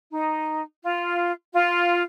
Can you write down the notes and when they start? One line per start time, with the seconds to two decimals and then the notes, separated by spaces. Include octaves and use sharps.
0.12 D#4
0.83 F4
1.54 F4